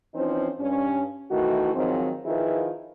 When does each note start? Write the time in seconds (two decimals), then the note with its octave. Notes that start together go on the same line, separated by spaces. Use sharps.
0.15 E3 F3 C4 C#4 D#4 C5
0.60 G2 C#4
1.31 D#3 E3 A3 E4 F#4
1.75 G#2 D#3 F3 F#3 C4
2.26 D#3 F3 E4 F4 G#4 B4